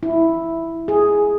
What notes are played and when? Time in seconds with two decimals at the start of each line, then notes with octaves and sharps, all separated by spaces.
0.03 E4
0.88 G#4